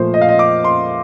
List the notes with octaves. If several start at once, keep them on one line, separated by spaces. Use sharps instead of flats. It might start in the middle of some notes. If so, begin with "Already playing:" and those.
Already playing: A#2 F3 A3 C5
D#5
F5
D#5
D6
C6